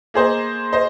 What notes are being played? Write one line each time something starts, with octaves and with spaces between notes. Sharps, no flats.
A#3 G#4 C5 D#5
C5 D#5